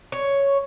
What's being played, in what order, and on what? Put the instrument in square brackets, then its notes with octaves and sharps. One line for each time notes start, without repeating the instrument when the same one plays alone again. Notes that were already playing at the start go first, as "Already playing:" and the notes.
[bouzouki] C#5